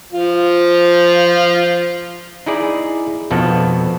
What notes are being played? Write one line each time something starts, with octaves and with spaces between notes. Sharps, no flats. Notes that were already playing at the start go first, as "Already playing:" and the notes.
F3 F4
D#4 E4 G#4 D5
F2 B2 F3 A4 F#5